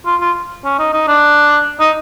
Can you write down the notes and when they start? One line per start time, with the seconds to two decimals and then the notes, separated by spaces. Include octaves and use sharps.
0.06 F4
0.21 F4
0.64 C#4
0.79 D#4
0.93 D#4
1.07 D4
1.80 D#4